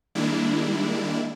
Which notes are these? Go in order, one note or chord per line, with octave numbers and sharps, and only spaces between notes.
D#3 G3 G#3 A#3 D4 E4